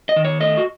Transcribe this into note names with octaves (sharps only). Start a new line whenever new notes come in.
D#5
D#3
C#5
A3 D#5
F#4